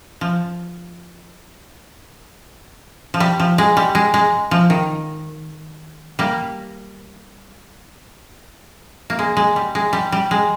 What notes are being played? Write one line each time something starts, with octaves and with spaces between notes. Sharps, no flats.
F3
F3
G3
F3
G#3
G3
G#3
G#3
F3
D#3
G3 A#3
A#3
G#3
G#3
G3
G#3
G3
G3
G#3